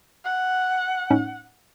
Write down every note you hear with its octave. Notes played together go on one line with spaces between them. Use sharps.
F#5
A2 C#4 D#4